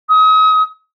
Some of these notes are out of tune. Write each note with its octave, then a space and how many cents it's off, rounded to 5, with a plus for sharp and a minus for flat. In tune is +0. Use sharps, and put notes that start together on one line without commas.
D#6 +35